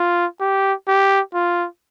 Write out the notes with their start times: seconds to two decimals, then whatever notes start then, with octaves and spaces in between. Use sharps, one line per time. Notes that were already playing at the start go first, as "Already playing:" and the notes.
Already playing: F4
0.40 G4
0.87 G4
1.34 F4